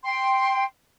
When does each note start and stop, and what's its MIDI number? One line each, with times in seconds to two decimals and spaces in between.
0.04 0.64 79
0.04 0.64 84